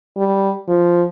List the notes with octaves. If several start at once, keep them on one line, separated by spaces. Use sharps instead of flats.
G3
F3